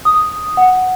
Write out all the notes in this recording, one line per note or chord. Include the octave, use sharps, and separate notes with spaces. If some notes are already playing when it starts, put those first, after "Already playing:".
D#6
F#5